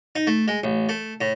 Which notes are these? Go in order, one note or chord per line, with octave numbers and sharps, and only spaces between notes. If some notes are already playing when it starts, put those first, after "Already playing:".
D#4
A3
G#3
A1
A3
A2